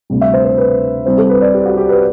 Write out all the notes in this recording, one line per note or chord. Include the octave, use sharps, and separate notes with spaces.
D2 C3 G3
E5
C5
C5
B4
C2 C3 G3 C4 C5
A4
B4
D5
G4
F#4
G4
B4